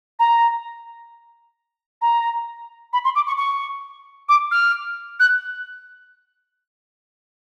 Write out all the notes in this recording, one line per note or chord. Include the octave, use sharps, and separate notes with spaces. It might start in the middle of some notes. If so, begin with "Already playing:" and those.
A#5
A#5
B5
C6
D6
C#6
C#6
D6
F6
F#6